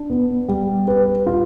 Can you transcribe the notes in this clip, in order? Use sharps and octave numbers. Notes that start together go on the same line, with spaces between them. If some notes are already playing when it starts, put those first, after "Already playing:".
Already playing: D4
B3
G3
B4
F4